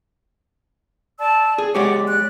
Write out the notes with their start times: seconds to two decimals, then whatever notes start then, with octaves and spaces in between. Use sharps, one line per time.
1.19 D5 A5 E6
1.58 G#4
1.75 G#3 G4 C#5 D5 F#5 D6
2.07 D5 F#6